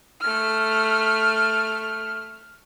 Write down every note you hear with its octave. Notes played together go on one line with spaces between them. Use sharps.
A3 F6